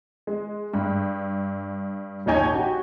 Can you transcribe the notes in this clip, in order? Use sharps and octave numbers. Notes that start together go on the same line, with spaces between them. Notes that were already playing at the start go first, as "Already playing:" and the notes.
G#3
G2
A#1 D#2 D#4 C#5 G#5 G6
F#4 G4